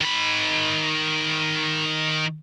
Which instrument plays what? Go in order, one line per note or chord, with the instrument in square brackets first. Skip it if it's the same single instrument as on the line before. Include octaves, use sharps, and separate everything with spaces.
[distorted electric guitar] D#3 B5